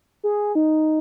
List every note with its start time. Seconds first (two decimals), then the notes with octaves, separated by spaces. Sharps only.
0.24 G#4
0.55 D#4